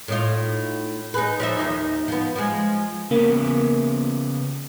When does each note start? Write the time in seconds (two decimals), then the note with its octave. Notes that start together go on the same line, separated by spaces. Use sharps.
0.08 A2 D#4 F4
1.14 D#4 G#4 B4
1.40 F3 D#4 E5
1.57 D#2 A#2 D#4
2.08 F3 B3
2.35 F3 G#3
3.11 C#3 A#3 B3